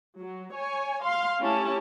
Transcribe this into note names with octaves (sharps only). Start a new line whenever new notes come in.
F#3
C#5 G#5
F5 C6
A3 C#4 E4 G4 A5